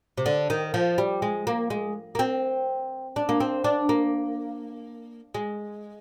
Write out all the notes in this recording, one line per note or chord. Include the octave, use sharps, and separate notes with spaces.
C3
D3
D#3
F3
G3
G#3
A#3
G#3
A#3
C4
D4
A#3
C4
D4
A#3
G#3